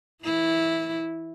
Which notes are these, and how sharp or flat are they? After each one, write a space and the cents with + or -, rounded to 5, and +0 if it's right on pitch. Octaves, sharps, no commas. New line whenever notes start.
E3 -5 E4 -10